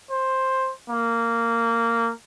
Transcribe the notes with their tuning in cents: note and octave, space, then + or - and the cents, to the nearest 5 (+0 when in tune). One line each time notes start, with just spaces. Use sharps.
C5 +10
A#3 -15